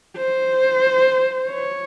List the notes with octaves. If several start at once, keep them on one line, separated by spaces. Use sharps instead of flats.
C5
C#5